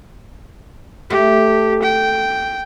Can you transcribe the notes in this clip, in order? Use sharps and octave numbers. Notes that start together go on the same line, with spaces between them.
A3 G4
G5